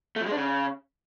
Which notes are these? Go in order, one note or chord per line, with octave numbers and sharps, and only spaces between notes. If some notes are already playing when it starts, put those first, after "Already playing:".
A3
F3
G#3
D4
C#3